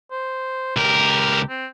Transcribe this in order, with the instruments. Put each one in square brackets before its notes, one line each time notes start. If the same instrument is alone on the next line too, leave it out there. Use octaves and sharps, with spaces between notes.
[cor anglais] C5
[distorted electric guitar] C#2 A#4 [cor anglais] G4
[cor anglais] C4